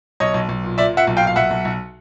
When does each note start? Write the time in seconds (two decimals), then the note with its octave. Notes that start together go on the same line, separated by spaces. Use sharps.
0.20 B1 C#5 D#5
0.34 B1
0.49 B1
0.63 A#2
0.78 A#2 D5 E5
0.93 A#2 E5 F#5
1.07 B1
1.17 F5 G5
1.22 A#2
1.27 F5
1.36 B1 E5 F#5
1.51 B1
1.65 B1